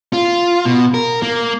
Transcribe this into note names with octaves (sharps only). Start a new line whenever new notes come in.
F4
B2
A#4
A#3